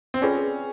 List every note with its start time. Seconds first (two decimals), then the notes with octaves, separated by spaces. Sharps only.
0.14 C4
0.22 C#4 F4 G#4 B4 D5 G5